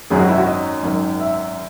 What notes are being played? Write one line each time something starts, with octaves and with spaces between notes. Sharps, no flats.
G#1 F#2 D#3 F#3 G#4
F#4
E4
F#4
D#5
G#1 F#2 D#3
E5